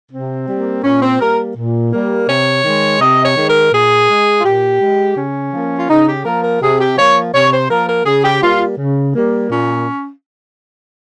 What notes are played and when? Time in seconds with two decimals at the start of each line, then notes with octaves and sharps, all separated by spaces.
0.12 C3 C4
0.48 G3 A#3
0.83 A#2 C#4
1.02 C4
1.19 G3 A#3 A#4
1.56 A#2
1.93 G3 A#3
2.28 C3 C#5
2.64 D#3 G#3
3.00 C3 D#5
3.24 C#5
3.37 D#3 G#3
3.49 A#4
3.72 A#2 G#4
4.09 G#3
4.38 F4
4.44 A#2 G4
4.81 G#3
5.16 C#3 C#4
5.53 F3 A#3
5.78 F4
5.89 C#3 D#4
6.08 G4
6.25 F3 A#3 A#4
6.43 A#4
6.61 C3 G#4
6.79 G4
6.98 F3 A#3 C#5
7.34 C3 C#5
7.52 C5
7.69 F3 A#3 A#4
7.87 A#4
8.05 C#3 G#4
8.23 G4
8.42 G3 A#3 F4
8.78 C#3
9.14 G3 A#3
9.50 A#2 C#4